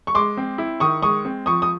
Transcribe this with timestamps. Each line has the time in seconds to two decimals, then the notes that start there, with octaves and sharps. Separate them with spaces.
0.07 C#6
0.15 G#3 C6 D6
0.37 C4
0.58 E4
0.80 D#3 C#6 D#6
1.02 G#3 C#6 D#6
1.25 C4
1.46 F3 C#6 D#6
1.62 D#6